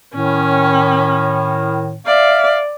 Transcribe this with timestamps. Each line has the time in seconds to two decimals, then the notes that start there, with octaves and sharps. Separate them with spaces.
0.15 A2 D#3 C#4
2.06 D5 E5 F5